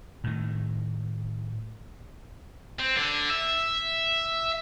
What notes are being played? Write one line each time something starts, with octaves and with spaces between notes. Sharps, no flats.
A2 D#3
C4
D3
E5